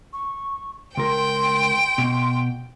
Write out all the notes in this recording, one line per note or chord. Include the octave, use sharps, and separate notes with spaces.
C#6
C#2 A#4 G5 C6
B2